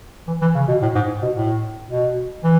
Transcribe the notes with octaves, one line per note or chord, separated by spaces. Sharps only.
E3
E3
C#3
B2
A2
G#2
B2
A2
B2
E3